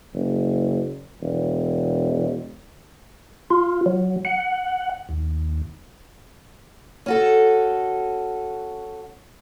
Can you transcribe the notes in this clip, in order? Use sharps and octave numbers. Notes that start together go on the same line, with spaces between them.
F#1
E1
F4
F#3
F#5
D#2
C#4 F#4 A4